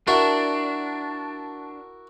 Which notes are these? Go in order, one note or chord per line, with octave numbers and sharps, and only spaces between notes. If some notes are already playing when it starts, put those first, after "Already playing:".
D4 E4 F#4 A#4